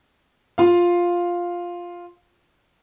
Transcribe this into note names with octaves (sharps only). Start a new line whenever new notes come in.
F4 F5